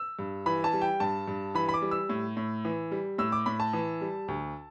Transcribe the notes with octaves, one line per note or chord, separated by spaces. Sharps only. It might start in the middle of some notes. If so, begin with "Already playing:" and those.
Already playing: E6
G2
E3 B5
A5
G3
G5
G2 A5
G2
E3 B5
B5
D6
G3
E6
A2
A2
E3
G3
A2 E6
D6
A2 B5
A5
E3
G3
D2